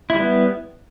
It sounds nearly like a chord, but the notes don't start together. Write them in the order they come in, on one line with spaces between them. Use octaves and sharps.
E4 G3 B3